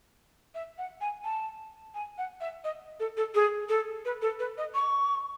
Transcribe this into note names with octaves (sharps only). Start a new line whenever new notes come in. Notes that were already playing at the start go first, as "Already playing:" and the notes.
E5
F#5
G#5
A5
G#5
F#5
E5
D#5
A4
A4
G#4
A4
B4
A4
B4
D#5
C#6